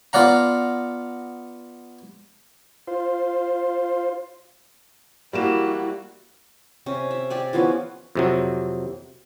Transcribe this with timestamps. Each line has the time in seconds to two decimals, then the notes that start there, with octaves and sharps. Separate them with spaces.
0.13 B3 F4 D5 F#5 A#5
2.88 F4 C5
5.33 G3 A#3 E4 F#4 E7
6.86 C3 C#4
7.11 E5
7.30 G4 D5 G#5
7.53 E3 F3 B3 C#4
8.15 F2 C3 F#3